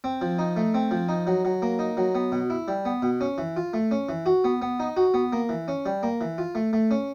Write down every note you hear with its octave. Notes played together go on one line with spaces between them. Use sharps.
C4
F3
D#4
A3
C4
F3
D#4
F#3
F#3
A#3
D#4
F#3
B3
B2
E4
G3
B3
B2
C#4
E3
F4
A3
C#4
E3
F#4
B3
B3
D#4
F#4
B3
A#3
E3
C#4
G3
A#3
E3
F4
A3
A3
C#4